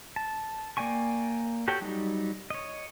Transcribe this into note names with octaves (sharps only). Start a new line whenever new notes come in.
A5
A#3 D5 G5 G#5 C#6
F#4 G4 A4 C#5 G5
F#3 G3 D#4
C#5 D#5